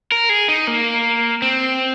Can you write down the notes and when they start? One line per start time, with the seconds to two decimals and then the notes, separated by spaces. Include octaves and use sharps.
0.12 A#4
0.29 G#4
0.49 D#4
0.67 A#3
1.42 C4